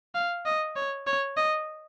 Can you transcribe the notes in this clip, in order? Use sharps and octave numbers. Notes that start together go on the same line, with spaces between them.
F5
D#5
C#5
C#5
D#5